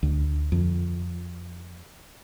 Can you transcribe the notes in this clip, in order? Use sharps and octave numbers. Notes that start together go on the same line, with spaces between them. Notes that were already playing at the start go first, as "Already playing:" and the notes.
D2
F2